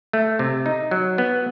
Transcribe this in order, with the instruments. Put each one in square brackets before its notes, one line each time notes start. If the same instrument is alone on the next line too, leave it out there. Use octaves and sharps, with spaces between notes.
[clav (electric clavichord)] A3
C3
D#4
F#3
B3